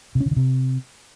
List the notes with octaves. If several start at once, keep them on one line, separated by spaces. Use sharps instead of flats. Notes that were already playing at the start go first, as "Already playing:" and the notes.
C3
C#4
C#3
D3
C3